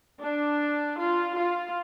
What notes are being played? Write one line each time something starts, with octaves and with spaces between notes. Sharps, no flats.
D4
F4
F4